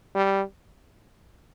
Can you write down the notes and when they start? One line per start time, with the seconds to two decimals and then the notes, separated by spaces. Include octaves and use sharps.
0.15 G3